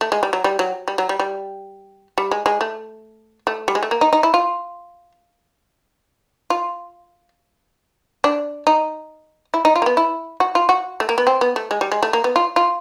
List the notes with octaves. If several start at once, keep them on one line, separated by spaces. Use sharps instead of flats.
A3
G#3
G3
F#3
G3
F#3
G3
F#3
G3
G3
G3
G#3
G#3
A3
A3
G3
G#3
A3
A#3
D#4
D#4
E4
F4
F4
D4
D#4
E4
D#4
F4
A#3
B3
E4
F#4
F4
F#4
A3
A#3
B3
C4
B3
A3
G#3
G3
G#3
A3
A#3
B3
F4
F4